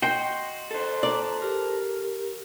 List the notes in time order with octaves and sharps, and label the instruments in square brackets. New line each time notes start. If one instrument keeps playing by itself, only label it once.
[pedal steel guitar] F#4 D#5 C6 [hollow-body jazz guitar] G5
[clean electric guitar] A4 C5
[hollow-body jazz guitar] D5 [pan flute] A#5
[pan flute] G4 [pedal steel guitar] A#4